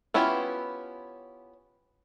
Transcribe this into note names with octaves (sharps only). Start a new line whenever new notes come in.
B3 C#4 E4 F4 G4